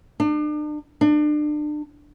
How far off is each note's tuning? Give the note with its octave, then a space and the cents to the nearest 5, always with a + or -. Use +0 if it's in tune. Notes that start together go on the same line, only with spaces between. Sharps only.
D4 +40
D4 +35